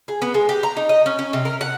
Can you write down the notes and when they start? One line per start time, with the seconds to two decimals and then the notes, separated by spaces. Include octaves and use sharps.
0.08 G#4
0.22 B3
0.34 G#3
0.49 G4
0.63 A#5
0.77 D#4
0.89 D#5
1.06 C#4
1.19 C#4
1.33 C3
1.45 A#4
1.61 F#5